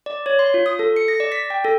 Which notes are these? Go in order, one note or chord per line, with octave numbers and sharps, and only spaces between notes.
D5
C#5
C6
F4
D#6
A4
C#7
A#6
D5
B6
G5
A4